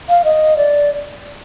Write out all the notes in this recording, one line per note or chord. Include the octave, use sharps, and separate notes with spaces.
F5
D#5
D5